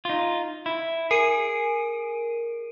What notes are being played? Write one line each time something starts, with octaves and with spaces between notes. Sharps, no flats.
D#4 F4
E4
G#4 A#4 D7 D#7